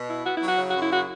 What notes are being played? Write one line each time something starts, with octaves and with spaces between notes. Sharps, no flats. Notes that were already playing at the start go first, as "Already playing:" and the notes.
Already playing: B2
E4
B3 F#4
E4
F#3
F#4
C#3
F#4
F#2
E4
C#3 F#4